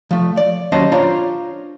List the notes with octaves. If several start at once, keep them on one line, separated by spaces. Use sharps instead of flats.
F3 A3
D5
D#2 F#3 C#4 C5 D#5 A5
D4 F4 C5 C#5 A#5 C6